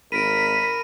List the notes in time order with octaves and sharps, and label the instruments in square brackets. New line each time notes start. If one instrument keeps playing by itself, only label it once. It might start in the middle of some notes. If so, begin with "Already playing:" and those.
[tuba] G#1 [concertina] A#4 A#5 B5 [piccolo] B6 [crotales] D7 D#7